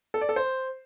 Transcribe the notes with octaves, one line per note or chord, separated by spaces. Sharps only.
A4
D5
A4
C5